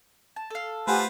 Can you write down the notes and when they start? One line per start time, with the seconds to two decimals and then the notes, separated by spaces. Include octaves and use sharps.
0.36 A5
0.50 A4 F5
0.87 A3 F4 G4 B4 C5 F#5 G#5